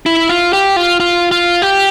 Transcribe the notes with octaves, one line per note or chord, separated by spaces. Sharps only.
E4
F4
G4
F4
F4
F4
G4